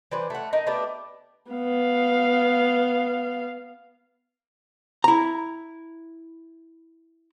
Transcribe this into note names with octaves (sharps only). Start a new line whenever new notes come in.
E3 G3 B4 C5
A3 F#5
D#4 A#4
A3 B3 D4 G4
B3 F5
E4 A#5